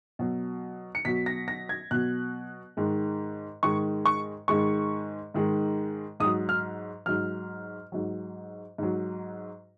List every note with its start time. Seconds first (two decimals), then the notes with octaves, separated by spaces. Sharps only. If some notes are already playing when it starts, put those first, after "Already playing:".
0.19 B2 F#3
0.95 C#7
1.05 B2 F#3 B6
1.26 A#6
1.48 A#6
1.69 G#6
1.91 B2 F#3 F#6
2.77 G#2 D#3 G#3
3.63 G#2 D#3 G#3 C#6
4.06 C#6
4.48 G#2 D#3 G#3 C#6
5.34 G#2 D#3 G#3
6.20 G#2 D#6
6.25 F#3
6.49 F6
7.06 G#2 F#3 F6
7.92 G#2 F#3
8.78 G#2 F#3